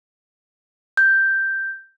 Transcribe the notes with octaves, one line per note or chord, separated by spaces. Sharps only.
G6